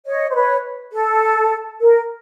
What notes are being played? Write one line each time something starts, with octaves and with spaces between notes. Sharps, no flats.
C#5 D#5
C5
B4 C#5
A4
A#4